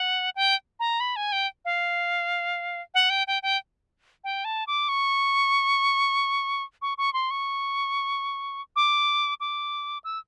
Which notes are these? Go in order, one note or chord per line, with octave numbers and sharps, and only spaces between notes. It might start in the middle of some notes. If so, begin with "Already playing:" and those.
Already playing: F#5
G5
A#5
B5
G#5
G5
F5
F#5
G5
G5
G5
G5
A5
D6
C#6
C#6
C#6
C6
C#6
D6
D6
E6